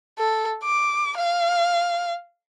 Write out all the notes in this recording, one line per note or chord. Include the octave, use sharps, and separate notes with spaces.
A4
D6
F5